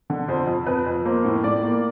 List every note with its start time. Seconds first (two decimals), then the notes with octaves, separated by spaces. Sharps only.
0.10 D3
0.28 F2 C5
0.47 F2
0.66 F2 B4
0.86 F2
1.05 A#3 C5
1.25 A2
1.44 A2 D5
1.63 A#3